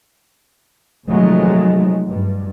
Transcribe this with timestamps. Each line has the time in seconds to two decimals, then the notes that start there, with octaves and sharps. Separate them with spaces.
1.07 C3 D#3 F3 F#3 G#3 A3
2.09 G2